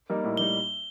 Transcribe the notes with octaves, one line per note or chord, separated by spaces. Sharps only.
G3 A#3 D#4
A2
G3 A#3 D#4 G7